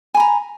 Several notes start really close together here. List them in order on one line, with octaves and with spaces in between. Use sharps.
G#5 B5 A#5